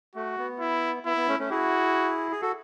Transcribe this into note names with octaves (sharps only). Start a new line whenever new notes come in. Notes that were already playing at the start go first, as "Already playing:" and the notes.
A3 F#4
B3
E4
B3 E4
B3
A3 C#4
A3 C#4
E4 F#4 G#4
G#4
F#4 A4